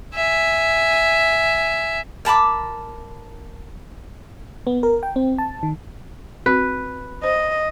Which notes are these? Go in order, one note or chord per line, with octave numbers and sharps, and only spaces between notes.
E5 G#5
A#4 A5 B5 D6
B3
A#4
G5
C4
A5
D#3
C4 F#4 B4
C5 D#5